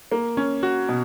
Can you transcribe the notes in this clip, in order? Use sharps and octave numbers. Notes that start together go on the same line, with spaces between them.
A#3
C#4
F#4
B2